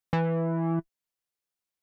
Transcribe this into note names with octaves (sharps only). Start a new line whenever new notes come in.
E3